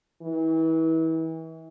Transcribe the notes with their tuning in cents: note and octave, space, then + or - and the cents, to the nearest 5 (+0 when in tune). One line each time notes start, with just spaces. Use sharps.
E3 -35